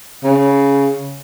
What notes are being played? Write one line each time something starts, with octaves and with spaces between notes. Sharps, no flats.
C#3